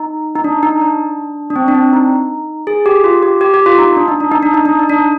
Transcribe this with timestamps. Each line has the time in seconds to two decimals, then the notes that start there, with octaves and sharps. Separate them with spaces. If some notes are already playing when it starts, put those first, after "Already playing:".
Already playing: D#4
0.36 D#4
0.44 D4
0.63 D#4
0.81 D4
1.50 D4
1.56 C4
1.68 D4
1.74 C4
1.93 D#4
2.67 G#4
2.86 G4
3.04 F4
3.23 G4
3.41 G4
3.54 G4
3.66 F4
3.78 D#4
3.97 D4
4.08 D#4
4.20 D4
4.32 D#4
4.43 D4
4.54 D#4
4.65 D4
4.80 D#4
4.89 D4